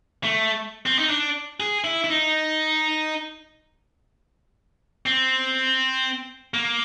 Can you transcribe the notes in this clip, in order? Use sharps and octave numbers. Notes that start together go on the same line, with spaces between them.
A3
C4
D#4
D4
G#4
E4
E4
D#4
C4
A#3